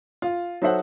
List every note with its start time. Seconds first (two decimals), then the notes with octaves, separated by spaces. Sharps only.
0.22 F4
0.62 F#3 D#4 A4 C5 E5 F#5